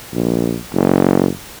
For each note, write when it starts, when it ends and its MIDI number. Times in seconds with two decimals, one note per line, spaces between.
0.13 0.58 34
0.74 1.27 30